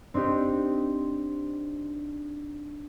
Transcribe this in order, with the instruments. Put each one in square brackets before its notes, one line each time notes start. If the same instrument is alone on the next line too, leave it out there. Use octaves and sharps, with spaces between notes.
[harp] C4 D4 D#4 G4